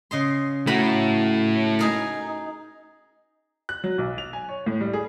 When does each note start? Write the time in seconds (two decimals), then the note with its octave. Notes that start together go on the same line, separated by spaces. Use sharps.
0.11 C#3 D#5 C6
0.67 A3 E4 F#4 A#5 B5
1.79 D#4 G#4 A#4
3.69 F#6
3.84 F#3
3.98 B1
4.18 F7
4.33 G#5
4.49 C#5
4.66 A2
4.81 G3
4.93 G#4